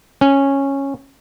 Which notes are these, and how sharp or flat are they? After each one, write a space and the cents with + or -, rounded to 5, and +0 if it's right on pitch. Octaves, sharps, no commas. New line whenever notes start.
C#4 -10